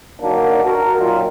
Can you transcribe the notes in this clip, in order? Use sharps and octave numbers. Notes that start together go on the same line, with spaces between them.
D3 D#3 F#3 A#3 D4
F#4 A#4
F#2 A#2 D#3 F#3 F4